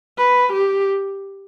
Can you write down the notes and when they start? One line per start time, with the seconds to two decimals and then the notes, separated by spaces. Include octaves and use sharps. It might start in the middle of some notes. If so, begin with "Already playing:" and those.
0.18 B4
0.53 G4